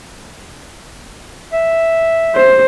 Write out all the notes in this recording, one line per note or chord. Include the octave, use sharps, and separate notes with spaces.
E5
C5